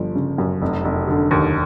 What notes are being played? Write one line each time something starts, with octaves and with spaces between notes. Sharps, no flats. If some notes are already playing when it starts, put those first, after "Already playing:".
Already playing: G1 F3
C#3
F#2
F1
F1
D3
D#2